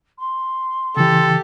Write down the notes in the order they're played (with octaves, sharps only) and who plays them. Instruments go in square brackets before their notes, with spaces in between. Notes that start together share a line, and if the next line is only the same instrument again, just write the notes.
[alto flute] C6
[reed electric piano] C#3 E3 [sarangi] G4 [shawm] A4